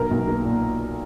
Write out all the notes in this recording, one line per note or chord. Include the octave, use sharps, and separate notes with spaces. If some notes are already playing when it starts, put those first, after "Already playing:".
Already playing: B1 A#4
B1
A#3
A#2